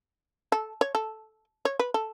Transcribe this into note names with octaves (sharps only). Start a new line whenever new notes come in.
A4
C#5
A4
C#5
B4
A4